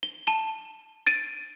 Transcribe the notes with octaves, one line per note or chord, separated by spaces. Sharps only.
G7
A5 E7 G7
A6 D7 D#7